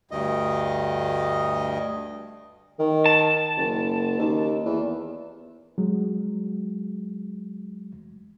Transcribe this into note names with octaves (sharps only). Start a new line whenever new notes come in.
D2 G2 D#5
D#3
A5
F#1
D#2
E2
F#3 G#3